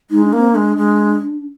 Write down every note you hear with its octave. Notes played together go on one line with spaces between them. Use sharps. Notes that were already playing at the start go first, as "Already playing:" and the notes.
G#3 D#4
D4
A#3
C4
G#3 D4
G#3